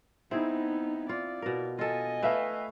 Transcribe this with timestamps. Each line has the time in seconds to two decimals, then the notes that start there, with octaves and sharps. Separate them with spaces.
0.31 B3 C4 D#4 E4 G#4
1.09 F4 D5
1.42 B2 A#4
1.79 F4 A4 D#5 G#5
2.23 A3 B4 E5 F5